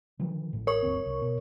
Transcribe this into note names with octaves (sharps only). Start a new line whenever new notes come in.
D3 D#3 F3
A1 A2
A#4 C#5 C#6
G1 D2 C4
C2
B2